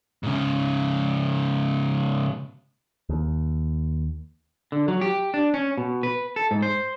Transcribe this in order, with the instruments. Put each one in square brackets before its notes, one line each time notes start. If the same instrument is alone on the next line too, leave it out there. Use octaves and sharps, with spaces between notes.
[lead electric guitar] G#2 C#3
[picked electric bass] D#2
[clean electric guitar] D3
F#3
G4
D4
C#4
B2
B4
A4
G#2
C5